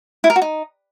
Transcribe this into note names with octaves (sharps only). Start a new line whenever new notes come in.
E4
A#4
F#4
D#4